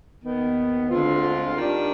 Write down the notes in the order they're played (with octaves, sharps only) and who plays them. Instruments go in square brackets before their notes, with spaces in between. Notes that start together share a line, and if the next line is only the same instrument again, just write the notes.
[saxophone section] D#2 D#3 B3
D2 D3 G#3 C4 F4
D#3 G3 D4